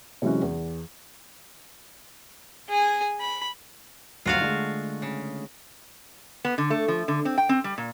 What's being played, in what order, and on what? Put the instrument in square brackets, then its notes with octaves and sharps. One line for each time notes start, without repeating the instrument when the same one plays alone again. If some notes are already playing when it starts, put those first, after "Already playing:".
[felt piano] C3 E3 F#3 G#3 C#4 F#4
E2
[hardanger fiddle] G#4 G#5
B5
[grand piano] G1 D#2 F#3 [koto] F4 F#4 F5
[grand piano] D3 G#3 A3
[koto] C#3
[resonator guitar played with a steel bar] B3
D3
A3
F3
D3
C4
G5
C4
G3
A#2